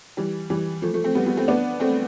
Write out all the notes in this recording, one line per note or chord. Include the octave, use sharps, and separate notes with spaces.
E3 G3
E3 G3
F3 A3
F3 A3
A3 C4
G3 B3
G3 B3
A3 C4
B3 D4
A3 C4